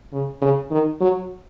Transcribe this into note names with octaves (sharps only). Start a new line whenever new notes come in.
C#3
C#3
D#3
F#3